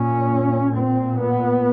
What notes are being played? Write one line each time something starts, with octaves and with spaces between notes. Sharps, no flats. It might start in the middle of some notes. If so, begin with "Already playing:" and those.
Already playing: A#2 C#4
A#2 C4
B3